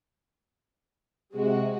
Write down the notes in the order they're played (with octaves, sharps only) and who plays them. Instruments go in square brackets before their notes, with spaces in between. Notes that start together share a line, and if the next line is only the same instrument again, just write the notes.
[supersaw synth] C3 [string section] G#3 F#4